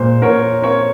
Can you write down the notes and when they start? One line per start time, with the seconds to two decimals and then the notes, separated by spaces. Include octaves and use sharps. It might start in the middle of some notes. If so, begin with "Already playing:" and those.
Already playing: A#2 G#3 C5
0.22 A#2 A#4 C#5
0.62 C4 A#4 C#5